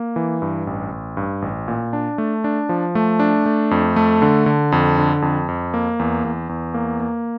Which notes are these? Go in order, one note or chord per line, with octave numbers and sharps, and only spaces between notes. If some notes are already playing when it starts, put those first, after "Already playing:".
Already playing: A#3
E3
G2
A1
A1
G2
A1
A#2
D4
A3
D4
F3
A3
D4
A3
F2
A3
D3
D3
F2
D3
F2
F2
A#3
E2
E2
E2
A#3
A#3